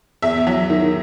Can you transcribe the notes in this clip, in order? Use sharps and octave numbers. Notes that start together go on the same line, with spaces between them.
E2 E5
F#3
D#3